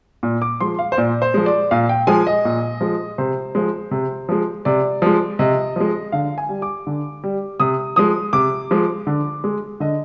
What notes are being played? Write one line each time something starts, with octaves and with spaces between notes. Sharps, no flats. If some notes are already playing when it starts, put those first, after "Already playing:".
A#2
D6
F3 G#3 C6
F5
C5
A#2 D5
C5
F3 G#3
D5
A#2 F5
G5
F3 G#3 G#5
D#5
A#2
F3 G#3
C3 C5
F3 G#3
C3
F3 G#3
C3 D5
F3 G#3
C3 D#5
F3 G#3
D3 F5
G#5
G3
D6
D3
G3
C3 D#6
F3 G#3 D#6
C3 D6
F3 G#3
D3
G#3
D3 D#5